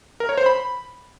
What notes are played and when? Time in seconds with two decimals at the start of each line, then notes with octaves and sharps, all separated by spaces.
0.20 A#4
0.29 C#5
0.38 C5
0.46 B5